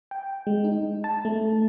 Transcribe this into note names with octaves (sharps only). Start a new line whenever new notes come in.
G5
G#3
D#4
A5
A3